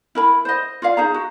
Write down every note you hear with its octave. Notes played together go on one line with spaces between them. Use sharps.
E4 A#4 B5
C5 D#5
F4 D5 F5
D#4 G#4 A#5
F#4